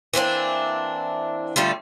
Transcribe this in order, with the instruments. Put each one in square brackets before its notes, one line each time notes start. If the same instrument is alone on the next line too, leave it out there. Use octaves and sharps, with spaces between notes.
[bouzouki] E3 A#3 C4 D4
D3 G3 A3 F4